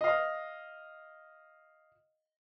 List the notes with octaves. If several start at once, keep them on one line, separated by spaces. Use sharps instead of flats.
D#5 F5